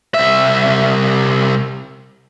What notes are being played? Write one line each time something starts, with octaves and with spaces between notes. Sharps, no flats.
C2 E5